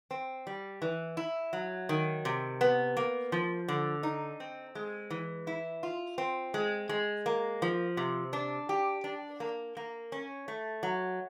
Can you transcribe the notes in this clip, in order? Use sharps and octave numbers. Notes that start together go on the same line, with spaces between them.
C4
G3
E3
E4
F#3
D#3
C3
B3
A#3
F3
D3
D#4
C4
G#3
E3
E4
F4
C4
G#3
G#3
A#3
F3
C3
D4
G4
D4
A#3
A#3
C#4
A3
F#3